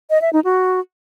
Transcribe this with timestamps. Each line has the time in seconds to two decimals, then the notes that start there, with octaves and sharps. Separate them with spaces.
0.10 D#5
0.22 E5
0.33 D#4
0.44 F#4